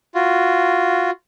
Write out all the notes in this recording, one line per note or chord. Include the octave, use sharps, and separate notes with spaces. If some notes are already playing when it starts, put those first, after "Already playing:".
F4 F#4